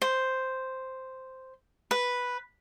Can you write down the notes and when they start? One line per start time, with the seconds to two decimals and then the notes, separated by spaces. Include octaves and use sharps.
0.02 C5
1.91 B4